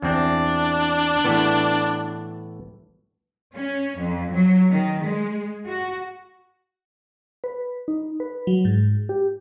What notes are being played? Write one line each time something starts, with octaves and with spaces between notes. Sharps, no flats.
E2 C4 D4
A2 E3 B3
C#4
F2
F#3
D#3
G#3
F#4
B4
D#4
B4
F#3
G#2
G4